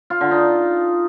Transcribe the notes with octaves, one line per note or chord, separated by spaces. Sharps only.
F4
D3
D#4